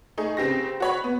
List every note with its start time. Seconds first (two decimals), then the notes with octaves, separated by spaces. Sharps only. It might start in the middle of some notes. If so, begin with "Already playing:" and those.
0.18 A3 D#4 G#4
0.37 C#3 C4 G4 A#6
0.80 F#4 C#5 B5
1.04 B3